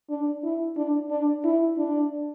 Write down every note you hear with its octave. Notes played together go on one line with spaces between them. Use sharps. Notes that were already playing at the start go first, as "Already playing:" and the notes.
D4
E4
D4
D4
E4
D4